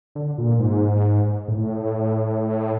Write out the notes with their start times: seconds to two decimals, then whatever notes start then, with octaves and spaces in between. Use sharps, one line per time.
0.15 D3
0.38 A#2
0.59 G#2
1.48 A2